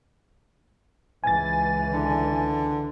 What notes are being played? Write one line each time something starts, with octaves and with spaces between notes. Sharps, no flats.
C#2 E3 G#5 A6
D3